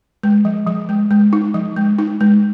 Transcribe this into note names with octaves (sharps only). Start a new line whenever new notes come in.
G#3
F3
F3
G#3
G#3
D#4
F3
G#3
D#4
G#3